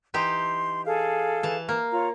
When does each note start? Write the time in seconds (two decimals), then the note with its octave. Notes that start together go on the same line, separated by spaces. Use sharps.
0.14 E3 D#4 G4 C6
0.85 G#4 A4 F5
1.43 E3 A5
1.69 A#3
1.91 F4 C#5 A#5